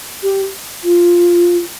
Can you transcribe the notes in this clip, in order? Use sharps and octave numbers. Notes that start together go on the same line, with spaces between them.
G4
F4